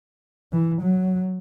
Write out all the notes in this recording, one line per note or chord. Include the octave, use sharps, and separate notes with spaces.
E3
F#3